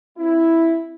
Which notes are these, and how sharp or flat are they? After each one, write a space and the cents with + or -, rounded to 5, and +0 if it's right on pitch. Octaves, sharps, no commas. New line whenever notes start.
C4 +0 E4 +0